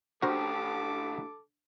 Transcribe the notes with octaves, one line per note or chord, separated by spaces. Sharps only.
A2 D4 F#4 G4 A4 A#4 C5 D6